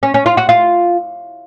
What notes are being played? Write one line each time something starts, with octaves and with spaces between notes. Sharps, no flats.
C#4
C#4
F4
F#4
F4